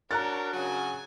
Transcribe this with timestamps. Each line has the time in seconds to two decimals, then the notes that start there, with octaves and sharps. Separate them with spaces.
0.11 D4 F#4 A#4 C#5 A#5 F#6 A6
0.53 C#3 F#3 F#4 G#5